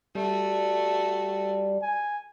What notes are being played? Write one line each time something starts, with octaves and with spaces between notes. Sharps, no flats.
G3 A3 F#4
G#5